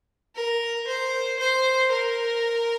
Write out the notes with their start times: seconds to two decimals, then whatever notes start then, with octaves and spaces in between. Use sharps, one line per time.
0.35 A#4
0.87 C5
1.39 C5
1.91 A#4